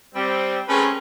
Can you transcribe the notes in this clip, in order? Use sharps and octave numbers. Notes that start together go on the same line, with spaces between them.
G3 C4
A3 C4 C#4 G#4 A#4 B4